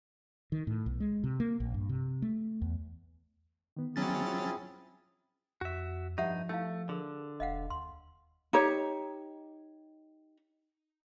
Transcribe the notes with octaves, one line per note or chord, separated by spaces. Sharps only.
D#3
A2
B1
G#3
C3
A#3
A#1
G2
C3
A3
E2
D#3 B3
F#3 C4 C#4 E4 G#4 A6
F4
F2 F#4 E5
G2 F3 D#4 G4 E5 F#5
A3 D#4 E4 F5
D3 G#4 A#4
E1 D#5 F5 F#5
D#2 C6
D#4 G4 C#5